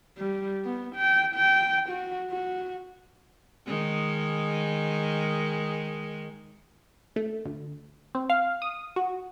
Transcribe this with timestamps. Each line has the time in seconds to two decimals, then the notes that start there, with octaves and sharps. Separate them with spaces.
0.18 G3
0.64 B3
0.95 G5
1.35 G5
1.89 F#4
2.30 F#4
3.66 D#3 G#3
7.16 A3
7.45 D2
8.15 C4
8.30 F5
8.62 D#6
8.96 F#4